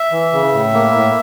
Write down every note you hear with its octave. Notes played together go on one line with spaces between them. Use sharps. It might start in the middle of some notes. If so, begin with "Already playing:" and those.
Already playing: E5
E3
C#3
A2
A#3
A2